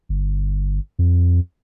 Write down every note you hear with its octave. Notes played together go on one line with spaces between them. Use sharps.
G1
F2